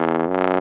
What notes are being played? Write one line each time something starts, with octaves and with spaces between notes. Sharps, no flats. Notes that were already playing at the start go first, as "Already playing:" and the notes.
Already playing: E2
F#2